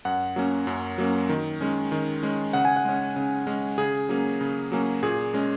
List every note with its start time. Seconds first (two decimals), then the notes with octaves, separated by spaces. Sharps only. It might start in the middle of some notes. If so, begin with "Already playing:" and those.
0.05 F#2 F#5
0.36 F#3 A#3 C#4
0.67 F#2
0.98 F#3 A#3 C#4
1.29 D#3
1.61 G#3 C#4
1.92 D#3
2.23 G#3 C#4
2.53 C#3 F#5
2.65 G#5
2.76 F#5
2.85 G#3 C#4
3.16 C#3
3.47 G#3 C#4
3.78 C#3 G#4
4.09 F#3 A#3 C#4
4.41 C#3
4.72 F#3 A#3 C#4
5.03 A#2 G#4
5.34 G#3 C#4